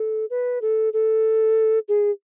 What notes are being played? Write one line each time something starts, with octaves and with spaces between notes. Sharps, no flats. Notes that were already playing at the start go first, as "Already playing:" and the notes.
Already playing: A4
B4
A4
A4
G#4